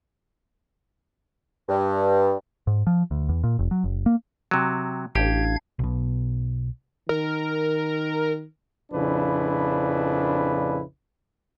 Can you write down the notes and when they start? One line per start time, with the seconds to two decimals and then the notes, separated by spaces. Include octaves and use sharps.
1.69 G2
2.67 G#2
2.87 F3
3.11 D2
3.29 E2
3.44 A#2
3.59 F1
3.71 F#3
3.84 F#1
4.06 A#3
4.51 C3 F#3
5.15 A1 D4 G4 F5 G#6
5.79 B1 B2
7.09 D#3 A#4
8.93 A#1 F2 C#3 D4 E4 B4